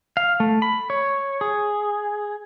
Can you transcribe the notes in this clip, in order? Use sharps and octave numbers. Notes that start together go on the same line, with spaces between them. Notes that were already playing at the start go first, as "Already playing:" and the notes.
F5
A3
B5
C#5
G#4